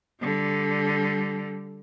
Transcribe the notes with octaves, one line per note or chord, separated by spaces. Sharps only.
D3 G3